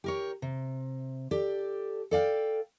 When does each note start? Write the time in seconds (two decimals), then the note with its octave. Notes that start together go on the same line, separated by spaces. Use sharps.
0.04 G4 A#4 C#5
0.42 C3
1.31 G4 A4 D5
2.11 A4 D5 F5 G5